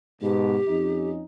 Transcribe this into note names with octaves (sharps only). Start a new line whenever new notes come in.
G#2 B2 G4
F2 C#4 D#4